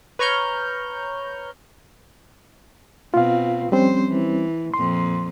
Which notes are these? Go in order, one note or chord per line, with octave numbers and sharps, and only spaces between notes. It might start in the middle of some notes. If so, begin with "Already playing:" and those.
B4 C#5 A#5 C#6 F6 G6
B2 C4 F4 F5
F2 G3 C4 C#4 C5
E3
F2 A#2 C6